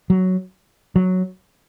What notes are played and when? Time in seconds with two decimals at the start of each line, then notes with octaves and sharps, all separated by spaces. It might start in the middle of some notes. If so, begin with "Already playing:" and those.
0.10 F#3
0.96 F#3